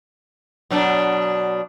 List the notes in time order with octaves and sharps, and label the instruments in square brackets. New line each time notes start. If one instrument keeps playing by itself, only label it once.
[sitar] B2 F#3 D4